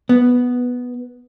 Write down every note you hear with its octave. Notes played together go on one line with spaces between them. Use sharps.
B3